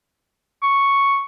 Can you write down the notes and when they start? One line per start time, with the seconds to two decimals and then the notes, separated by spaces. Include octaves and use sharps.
0.62 C#6